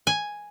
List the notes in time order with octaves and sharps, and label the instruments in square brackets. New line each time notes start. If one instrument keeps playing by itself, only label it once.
[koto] G#5